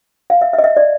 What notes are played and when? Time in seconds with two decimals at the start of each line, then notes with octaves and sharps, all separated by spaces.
0.30 F5
0.41 E5
0.53 E5
0.58 D#5
0.64 E5
0.77 D5